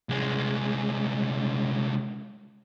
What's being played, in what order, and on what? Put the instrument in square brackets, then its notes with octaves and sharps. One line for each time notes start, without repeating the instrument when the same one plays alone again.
[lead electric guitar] C2 G#3